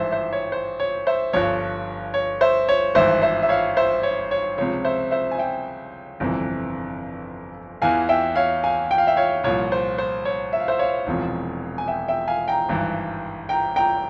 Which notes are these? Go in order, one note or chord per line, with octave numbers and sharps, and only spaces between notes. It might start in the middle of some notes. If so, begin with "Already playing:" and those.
Already playing: G#1 G2 E3 C5 E5
C5 E5
C#5
C5
C#5
C5 E5
G1 G2 F3 C#5
C#5
C5 E5
C#5
G#1 G2 E3 C5 E5
C5 E5
E5
C#5 F5
C5 E5
C#5
C#5
C#2 C3 F3 C#5
C5 E5
C5 E5
G#5
E5 G5
G1 F2 C3 E3
E2 E3 F5 G#5
E5 G5
C#5 F5
F5 G#5
G5
F5
E5 G5
C#5 F5
C2 A#2 F3 C#5
C5
C5
C#5
E5
F5
C5 E5
C#5 F5
E1 E2 C3 F3
G#5
E5 G5
E5 G5
F5 G#5
G5 A#5
G#1 G2 E3
G5 A#5
G5 A#5